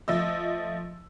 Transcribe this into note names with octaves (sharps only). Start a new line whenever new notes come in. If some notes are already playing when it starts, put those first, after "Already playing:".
F3 A3 D#5 E6